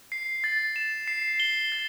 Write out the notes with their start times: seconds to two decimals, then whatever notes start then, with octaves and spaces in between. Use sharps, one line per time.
0.12 C7
0.44 A6
0.76 E7
1.08 C7
1.40 G7
1.72 A6